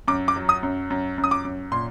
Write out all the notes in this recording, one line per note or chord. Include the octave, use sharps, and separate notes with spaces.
F#2 D6
D6
F#3
D#6
F#2
F#2
F#2
D#6
D6
F#2
A#2 C6